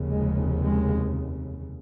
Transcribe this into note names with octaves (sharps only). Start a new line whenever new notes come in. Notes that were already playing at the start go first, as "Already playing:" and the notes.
Already playing: F1 D#2 C#3
G#3
G#3